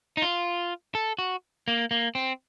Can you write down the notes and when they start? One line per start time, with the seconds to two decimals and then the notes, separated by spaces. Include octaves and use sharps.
0.17 D#4
0.22 F4
0.95 A4
1.19 F#4
1.68 A#3
1.91 A#3
2.15 C4